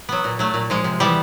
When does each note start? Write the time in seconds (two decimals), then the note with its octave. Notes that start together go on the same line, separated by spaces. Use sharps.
0.09 F#3 B3
0.24 A#2
0.39 F#3 A3
0.54 A#2
0.70 F3 G#3
0.84 C3
1.00 E3 G3 B3